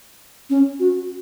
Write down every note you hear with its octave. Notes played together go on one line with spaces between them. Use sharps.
C#4
F#4